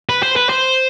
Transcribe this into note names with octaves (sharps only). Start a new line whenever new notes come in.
B4
C5
B4
C5